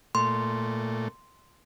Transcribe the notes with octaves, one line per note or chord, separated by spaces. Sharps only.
A#2 A3 C6